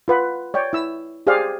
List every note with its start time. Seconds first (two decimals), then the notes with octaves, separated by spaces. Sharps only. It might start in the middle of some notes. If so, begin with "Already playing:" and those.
0.08 F4 B4 F#5
0.54 C#5 D5 G5
0.73 E4 E6
1.27 G4 G#4 C5 D5 F5